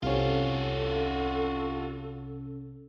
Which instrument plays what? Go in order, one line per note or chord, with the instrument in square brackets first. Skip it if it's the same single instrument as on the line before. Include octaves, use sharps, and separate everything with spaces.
[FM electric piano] C2 C3 C#4 [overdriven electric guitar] F4 F#4 [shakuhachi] A4